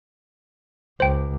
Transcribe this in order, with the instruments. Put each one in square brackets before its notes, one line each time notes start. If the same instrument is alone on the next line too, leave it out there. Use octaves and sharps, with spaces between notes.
[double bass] C#2 [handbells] C5 G5